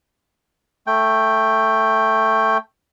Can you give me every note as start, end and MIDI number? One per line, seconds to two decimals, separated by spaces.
0.87 2.58 57
0.87 2.58 79